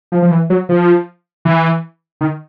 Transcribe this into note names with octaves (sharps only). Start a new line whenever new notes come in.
F3
F3
E3
F#3
F3
E3
D#3